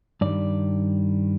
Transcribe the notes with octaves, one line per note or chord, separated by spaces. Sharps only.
G2 D#3 G3 D5